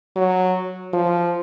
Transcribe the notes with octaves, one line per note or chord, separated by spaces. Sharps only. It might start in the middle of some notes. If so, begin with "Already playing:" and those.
F#3
F3